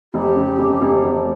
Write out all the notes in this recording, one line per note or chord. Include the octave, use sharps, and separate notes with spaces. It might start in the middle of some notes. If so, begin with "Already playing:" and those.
F1 G4
C#3
F1
F1
F1